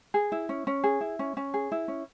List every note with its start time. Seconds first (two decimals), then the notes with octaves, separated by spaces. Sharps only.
0.14 G#4
0.32 E4
0.49 C#4
0.67 C#4
0.84 G#4
1.01 E4
1.19 C#4
1.37 C#4
1.54 G#4
1.72 E4
1.88 C#4